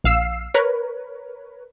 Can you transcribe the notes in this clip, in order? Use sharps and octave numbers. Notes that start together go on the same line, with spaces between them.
A#1 F5 E6 C7
A#4 B4 C#5